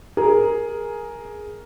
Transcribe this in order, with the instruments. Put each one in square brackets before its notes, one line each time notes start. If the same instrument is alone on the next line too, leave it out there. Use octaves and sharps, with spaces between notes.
[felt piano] G#4 [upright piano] A#4